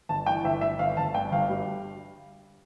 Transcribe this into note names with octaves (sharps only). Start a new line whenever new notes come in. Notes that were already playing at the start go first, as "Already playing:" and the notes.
G1 A5
E3 G5
G1 E5
G1 E5
G1 F5
G1 A5
G2 G5
G1 F5
G3